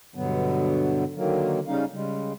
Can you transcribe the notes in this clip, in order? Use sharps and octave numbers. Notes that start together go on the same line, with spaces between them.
G2 B2 D3 F#3 B3
D3 D#3 F#3 A#3
C#3 G3 C#4 D#4 F5
C#3 G3 G#3